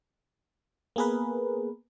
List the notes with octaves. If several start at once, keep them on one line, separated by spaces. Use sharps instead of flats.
A#3 B3 G#4 A#4 B4